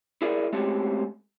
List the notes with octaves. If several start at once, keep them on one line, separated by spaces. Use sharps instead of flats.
E4 G#4 A#4 D5
G#3 A3 C4 C#4 F#4 G4